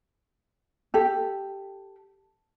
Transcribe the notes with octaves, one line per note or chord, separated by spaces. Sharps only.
G4 A4